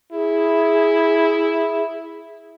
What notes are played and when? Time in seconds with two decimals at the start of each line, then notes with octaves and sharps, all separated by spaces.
0.12 E4 G#4